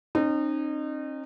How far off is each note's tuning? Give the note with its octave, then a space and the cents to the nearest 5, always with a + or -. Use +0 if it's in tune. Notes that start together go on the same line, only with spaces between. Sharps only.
C4 +45 D#4 -30